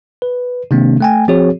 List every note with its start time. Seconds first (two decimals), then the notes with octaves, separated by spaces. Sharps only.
0.22 B4
0.71 C3 D#3 G#3 A#3 C4 D4
1.01 A3 G5 G#5
1.28 F3 C4 F#4 G#4 C#5